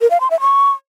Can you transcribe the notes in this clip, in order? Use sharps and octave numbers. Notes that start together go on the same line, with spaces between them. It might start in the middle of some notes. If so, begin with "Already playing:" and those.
A#4
F5
C6
E5
C#6